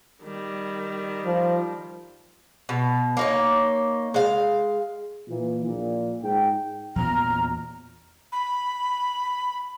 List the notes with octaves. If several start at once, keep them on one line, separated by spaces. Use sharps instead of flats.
D#3 G3
F3
B2
A#3 D#4 C#5
G#3 F5
A#2 E3
A#1 A#2
G#2 G5
E2 A#2 B3 A#5 F6
B5